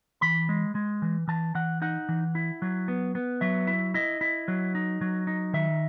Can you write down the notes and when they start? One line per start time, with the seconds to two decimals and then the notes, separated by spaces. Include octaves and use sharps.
0.21 E3 B5
0.49 G#3
0.75 G#3
1.02 E3
1.28 E3 A5
1.55 E3 F#5
1.82 D#4 F#5
2.09 E3
2.35 E4
2.62 F#3
2.88 B3
3.15 B3
3.41 F#3 E5
3.67 E4
3.94 E4 D#5
4.21 E4
4.48 F#3
4.75 D#4
5.01 F#3
5.27 D#4
5.53 D#3 E5